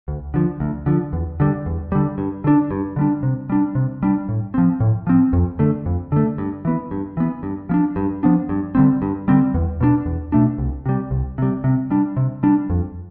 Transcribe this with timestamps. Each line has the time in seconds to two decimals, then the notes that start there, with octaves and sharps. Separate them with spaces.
0.08 D2
0.34 D3 F3
0.60 D2
0.86 D3 F3
1.13 E2
1.40 D3 G3
1.66 E2
1.92 D3 G3
2.18 G2
2.44 D3 G3 D4
2.71 G2
2.96 D3 G3 D4
3.23 C3
3.50 G3 D4
3.75 C3
4.03 G3 D4
4.29 A2
4.54 F3 C4
4.80 A2
5.07 F3 C4
5.33 F2
5.59 D3 A3
5.86 F2
6.12 D3 A3
6.38 G2
6.65 E3 B3
6.91 G2
7.17 E3 B3
7.43 G2
7.69 F3 B3
7.74 D4
7.96 G2
8.23 F3 B3 D4
8.49 G2
8.75 D3 G3 C4
9.02 G2
9.28 D3 G3 C4
9.54 E2
9.81 B2 A3 D4
10.06 E2
10.32 B2 A3 D4
10.58 C2
10.86 C3 G3
11.11 C2
11.38 C3 G3
11.64 C3
11.91 G3 D4
12.17 C3
12.43 G3 D4
12.70 F2